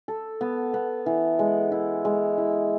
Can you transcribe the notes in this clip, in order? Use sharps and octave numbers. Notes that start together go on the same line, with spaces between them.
A4
B3
B3
E3
G#3
E4
G#3
E4